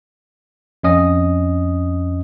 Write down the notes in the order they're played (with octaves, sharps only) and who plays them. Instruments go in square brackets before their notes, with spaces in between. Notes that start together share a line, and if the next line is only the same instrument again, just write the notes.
[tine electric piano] F2 C#4 D#5 D#6